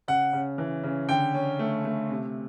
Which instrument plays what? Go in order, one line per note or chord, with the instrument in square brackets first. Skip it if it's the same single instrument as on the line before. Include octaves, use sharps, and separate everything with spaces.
[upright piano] C#3 [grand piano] F#5
[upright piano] C#3
E3
C#3
[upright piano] D3 [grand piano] G5
[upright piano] C#4
A3
A3
C3